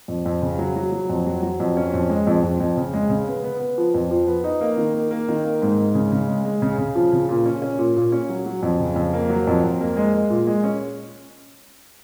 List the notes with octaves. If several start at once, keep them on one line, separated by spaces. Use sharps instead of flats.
F2
F2
C#3
F#3
F#3
F#3
F2
F#3
F#3
F2
C#4
F2
G#3
F2
F2
F2
C#3
G#3
C#3
B3
B3
B3
F3
F2
F3
B3
D#4
A#3
D#3
A#3
A#3
D#3
A#3
G#2
G#2
C#3
C#3
G#3
G#3
C#3
C#3
F3
C#3
A#2
C#4
C#4
A#2
A#2
C#4
F#3
F#3
F2
C#3
F2
A#3
F#3
F2
F2
A#3
G#3
G#3
A#2
G#3
C#4